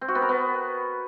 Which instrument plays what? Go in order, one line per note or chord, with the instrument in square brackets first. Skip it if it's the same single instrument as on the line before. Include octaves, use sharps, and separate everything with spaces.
[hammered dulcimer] C4
F#4
B3
A#4
B3